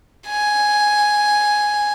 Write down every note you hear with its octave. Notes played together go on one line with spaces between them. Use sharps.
G#5